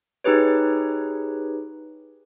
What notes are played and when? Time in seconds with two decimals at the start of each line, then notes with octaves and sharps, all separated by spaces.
0.24 D#4 G4 G#4 B4 C#5